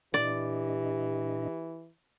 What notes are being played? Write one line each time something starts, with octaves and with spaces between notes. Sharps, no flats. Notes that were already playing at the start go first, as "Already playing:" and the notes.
A#2 E3 D4 G4 D5 D#5